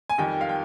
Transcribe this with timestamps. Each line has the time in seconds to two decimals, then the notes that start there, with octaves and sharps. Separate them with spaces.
0.10 G#5
0.18 F2 D#3 G3 G5
0.41 F5
0.49 G5